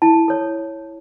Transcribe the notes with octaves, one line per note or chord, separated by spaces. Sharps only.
E4 A5
A4 C#5